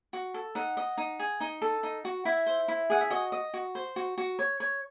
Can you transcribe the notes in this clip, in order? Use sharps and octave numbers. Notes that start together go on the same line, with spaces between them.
F#4
A4
D#4 F#5
D#5
D#4
G#4
D#4
A4
D#4
F#4
E4 E5
C5
E4
G#4 F#5
E5
F#4 D#5
D#5
F#4
C5
F#4
F#4
C#5
C#5